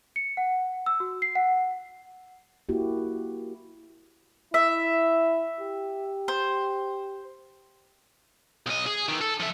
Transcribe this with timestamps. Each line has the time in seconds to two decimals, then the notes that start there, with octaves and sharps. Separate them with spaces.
0.16 C#7
0.37 F#5
0.86 E6
1.00 F#4
1.22 C7
1.35 F#5
2.69 A#3 E4 F#4 G4
4.54 E4 E5
5.60 G4
6.28 C5
8.67 B1 D#5
8.86 G#4
9.08 D#3 E3
9.21 A4
9.40 F3 E5